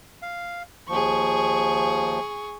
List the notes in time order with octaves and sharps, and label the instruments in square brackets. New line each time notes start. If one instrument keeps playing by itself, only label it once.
[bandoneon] F5
[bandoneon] D#2 F3 [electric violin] G#4 C#6